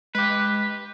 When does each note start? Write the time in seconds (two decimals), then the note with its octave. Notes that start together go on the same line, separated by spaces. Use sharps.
0.15 G#3 G4 B4